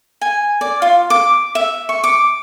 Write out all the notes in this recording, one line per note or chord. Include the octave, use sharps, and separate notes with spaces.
G#5
D5
F4
D6
E5
C#6
D6